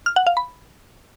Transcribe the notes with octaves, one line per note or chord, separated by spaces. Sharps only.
F6
F#5
F5
B5